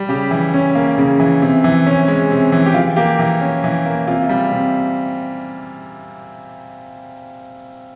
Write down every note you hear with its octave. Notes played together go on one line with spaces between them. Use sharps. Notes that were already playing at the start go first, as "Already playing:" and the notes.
Already playing: G3
C#3 G4
E3
C#4
A#3
C#3
E3
C3
E3
C#4
G#3
C3
E3
G4
E3 F4
A#3 G4
E3 A#4
C#4
E3
A#3
C3 F4
G3
C3